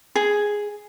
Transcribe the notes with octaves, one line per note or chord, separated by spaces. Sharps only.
G#4